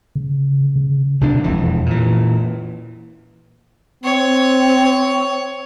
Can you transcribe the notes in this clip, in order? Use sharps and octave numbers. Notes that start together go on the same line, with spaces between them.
C#3
C#3
B1 C3 D4
E1 F2 E3
A#2 E3
C4 C#5